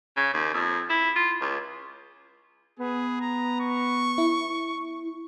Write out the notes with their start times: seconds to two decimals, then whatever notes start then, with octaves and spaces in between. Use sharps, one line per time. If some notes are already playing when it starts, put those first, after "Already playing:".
0.16 C#3
0.33 D#2
0.54 F2
0.89 E4
1.15 F4
1.41 C#2
2.79 B3 G#4
3.21 A#5
3.61 C#6
4.18 E4